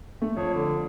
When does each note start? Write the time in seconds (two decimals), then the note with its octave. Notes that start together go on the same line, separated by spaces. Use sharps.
0.22 A3
0.37 F2 C#5
0.54 D3